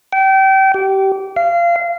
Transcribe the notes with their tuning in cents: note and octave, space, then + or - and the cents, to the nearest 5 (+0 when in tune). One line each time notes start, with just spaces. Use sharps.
G5 -30
G4 -25
F5 -25